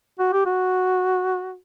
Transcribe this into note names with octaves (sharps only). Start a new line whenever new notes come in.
F#4
G4
F#4